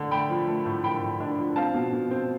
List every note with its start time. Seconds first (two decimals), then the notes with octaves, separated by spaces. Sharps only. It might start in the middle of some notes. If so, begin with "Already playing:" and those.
Already playing: D3
0.11 A3 G5 B5
0.29 F3
0.48 A3
0.66 A2
0.84 F3 G5 B5
1.02 A2
1.20 D4
1.38 F3
1.56 C4 F5 A5
1.74 B2
1.93 B2
2.11 C4